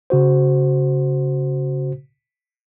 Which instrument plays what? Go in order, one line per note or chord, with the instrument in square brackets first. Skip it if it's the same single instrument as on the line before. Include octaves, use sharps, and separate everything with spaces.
[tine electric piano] C#3 F#4 C5